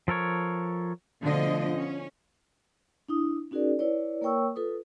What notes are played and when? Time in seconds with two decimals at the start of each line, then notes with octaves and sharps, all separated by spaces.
0.08 F3 A4 A#4 C#5
1.22 B2 D3 F3 A3 D#5
1.73 C#4
3.08 D4 E4 D#6
3.51 C#4 D#4 F#4 G#4 A#4 D5
3.79 E4 B4 C#5 D5
4.21 A#3 A#4 C#5 G5 C#6 E6
4.56 F4 A4 B4 D#6